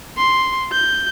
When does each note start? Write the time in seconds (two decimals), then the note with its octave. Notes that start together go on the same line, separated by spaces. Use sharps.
0.17 C6
0.72 G6